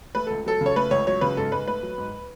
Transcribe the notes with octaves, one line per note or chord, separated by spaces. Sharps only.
A3 B4
C#2 A4
F#3 A4
C#3
C#5
A3 B4
C#2 C#5
F#3 C#5
C#3 B4
G#2 A4
G#2 B4
A3 B4
F#3
G#2